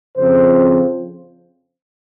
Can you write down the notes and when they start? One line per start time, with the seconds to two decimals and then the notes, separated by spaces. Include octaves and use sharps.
0.18 F2 C#3 F3 C4 C5